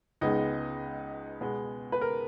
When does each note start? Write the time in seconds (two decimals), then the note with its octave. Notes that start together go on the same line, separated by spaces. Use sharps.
0.21 C#2 C#3 G#3 B3 D#4
1.41 B2 G#3 B3
1.92 B4
2.01 A#4